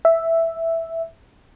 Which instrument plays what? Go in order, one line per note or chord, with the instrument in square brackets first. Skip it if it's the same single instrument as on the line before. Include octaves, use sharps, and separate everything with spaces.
[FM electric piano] E5